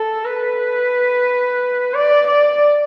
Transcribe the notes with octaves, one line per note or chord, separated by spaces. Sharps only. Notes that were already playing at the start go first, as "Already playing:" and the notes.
Already playing: A4
B4
D5
D5